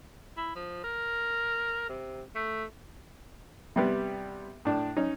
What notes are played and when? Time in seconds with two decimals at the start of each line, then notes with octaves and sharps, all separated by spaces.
0.37 E4
0.55 F3
0.84 A#4
1.89 C3
2.35 A3
3.76 C3 G3 B3
4.65 A2 D4
4.97 C#4 D#4